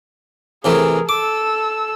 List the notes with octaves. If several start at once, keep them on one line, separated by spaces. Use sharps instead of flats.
C3 E3 A3 G#4 A#4
A4 D6 E6